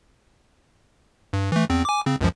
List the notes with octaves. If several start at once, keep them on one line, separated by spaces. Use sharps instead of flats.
G2
E3 A3
E2 C4
G#5 D6
C#3 C4
C#2 F#2 F3